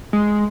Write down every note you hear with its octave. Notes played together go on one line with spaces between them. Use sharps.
G#3